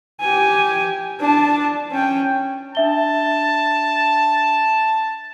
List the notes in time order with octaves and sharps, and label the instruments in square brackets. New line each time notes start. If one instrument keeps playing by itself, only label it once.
[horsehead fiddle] G4 G#5
D4 A5
C#4 G5
[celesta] D4 E5 G7 [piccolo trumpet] A5